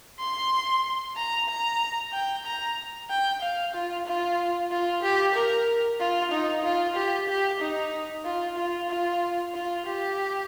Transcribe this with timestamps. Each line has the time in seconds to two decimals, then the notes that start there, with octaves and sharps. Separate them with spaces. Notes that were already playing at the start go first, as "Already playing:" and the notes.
0.20 C6
1.17 A#5
1.49 A#5
2.13 G5
2.46 A#5
3.10 G5
3.42 F5
3.74 F4
4.06 F4
4.71 F4
5.03 G4
5.35 A#4
6.00 F4
6.32 D#4
6.64 F4
6.96 G4
7.29 G4
7.60 D#4
8.25 F4
8.57 F4
8.90 F4
9.54 F4
9.86 G4